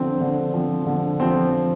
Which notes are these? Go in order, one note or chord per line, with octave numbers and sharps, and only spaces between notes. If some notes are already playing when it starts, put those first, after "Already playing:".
Already playing: D3 F3 C4
D3
F3 C4
D3
F3 C4